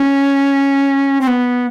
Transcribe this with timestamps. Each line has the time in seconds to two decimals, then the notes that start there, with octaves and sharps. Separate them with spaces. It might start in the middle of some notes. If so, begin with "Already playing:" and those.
Already playing: C#4
1.21 C4
1.27 B3